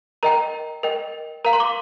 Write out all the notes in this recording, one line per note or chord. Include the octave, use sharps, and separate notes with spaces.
A#4 D#5 G5 A#5
A#4 D#5 G5
A#4 F5 A#5
C6
D6